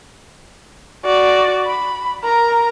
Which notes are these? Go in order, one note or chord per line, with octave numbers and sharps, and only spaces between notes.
F#4 D5
B5
A#4 A#5